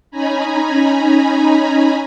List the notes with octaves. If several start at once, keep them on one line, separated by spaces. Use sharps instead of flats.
C#4 D#4 G#5 A#5 B5